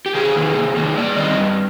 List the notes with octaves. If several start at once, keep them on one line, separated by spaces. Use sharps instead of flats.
G4
C3 G#4
D#3 A#3
C3
D#3 A#3
G2 D5
D#3 G3 C4 D#5
G2